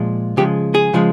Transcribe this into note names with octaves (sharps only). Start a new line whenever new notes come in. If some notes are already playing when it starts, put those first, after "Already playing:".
Already playing: A#2 F3 G#3
C#3 F3 G#3 G4
G#4
C#3 F3 G#3